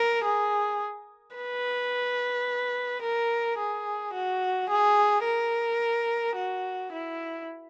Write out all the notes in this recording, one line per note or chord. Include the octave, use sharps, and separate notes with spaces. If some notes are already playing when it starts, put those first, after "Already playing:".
Already playing: A#4
G#4
B4
A#4
G#4
F#4
G#4
A#4
F#4
E4